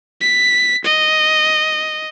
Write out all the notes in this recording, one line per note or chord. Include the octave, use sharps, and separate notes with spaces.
B6
D#5